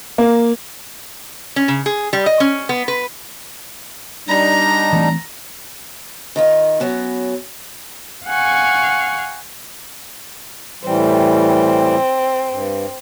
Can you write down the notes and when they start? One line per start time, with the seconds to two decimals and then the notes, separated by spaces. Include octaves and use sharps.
0.18 A#3
1.56 C#4
1.68 C#3
1.86 G#4
2.13 G3
2.26 D#5
2.40 C#4
2.69 B3
2.88 B4
4.28 G3 D4 D#4 A#5
4.93 E3 A3 C4
6.36 D#3 D#4 F4
6.80 F#3 B3 C#4
8.26 F5 F#5 G#5 C#6
10.83 A2 E3 G3 C4
12.49 G2